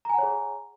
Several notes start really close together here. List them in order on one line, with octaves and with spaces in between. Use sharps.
A#5 G#5 F#5 C#5 G#4